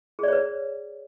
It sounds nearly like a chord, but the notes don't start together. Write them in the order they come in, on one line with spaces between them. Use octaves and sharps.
G#4 D5 C#5 B4